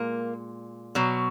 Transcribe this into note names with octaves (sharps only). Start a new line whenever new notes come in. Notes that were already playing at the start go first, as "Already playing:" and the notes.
Already playing: A#2 G#3 A#3
B2 F#3